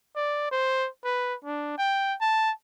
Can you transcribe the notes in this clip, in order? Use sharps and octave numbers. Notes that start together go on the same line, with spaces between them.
D5
C5
B4
D4
G5
A5